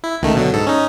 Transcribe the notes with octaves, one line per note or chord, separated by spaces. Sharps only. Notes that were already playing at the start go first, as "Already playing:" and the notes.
E4
C#2 D#3 A3
B2 D3 F#3
G#2 A4
C#4 D#4